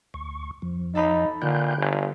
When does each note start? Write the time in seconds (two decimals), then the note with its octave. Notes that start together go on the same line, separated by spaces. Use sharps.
0.14 D2 C#6
0.62 F2 F3
0.95 D#4 A4 A5 B5
1.42 A#2 D3 G5 F#6 G6
1.77 G1